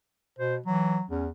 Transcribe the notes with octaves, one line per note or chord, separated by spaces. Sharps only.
B2 C5
E3 F#3
E2 C#4